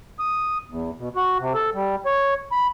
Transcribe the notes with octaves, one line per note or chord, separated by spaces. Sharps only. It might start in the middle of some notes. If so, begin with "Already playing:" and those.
D#6
E2
B2
F#4
C3
A4
G3
C#5
B5